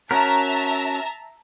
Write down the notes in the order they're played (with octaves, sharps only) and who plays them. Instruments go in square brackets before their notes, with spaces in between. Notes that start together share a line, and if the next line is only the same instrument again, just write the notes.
[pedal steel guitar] C#4 F#4 A#4 [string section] E5 A5 A#5